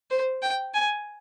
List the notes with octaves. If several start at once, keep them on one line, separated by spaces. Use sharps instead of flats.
C5
G5
G#5